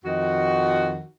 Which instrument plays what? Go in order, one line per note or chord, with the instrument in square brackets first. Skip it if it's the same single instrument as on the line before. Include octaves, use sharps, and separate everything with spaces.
[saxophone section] F2 D#3 F#4